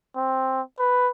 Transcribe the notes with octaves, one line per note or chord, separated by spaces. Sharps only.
C4
B4